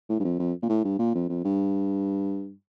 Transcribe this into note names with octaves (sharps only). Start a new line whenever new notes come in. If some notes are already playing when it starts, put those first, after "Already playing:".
A2
G2
F2
F2
A#2
A2
G2
A#2
F2
F2
G2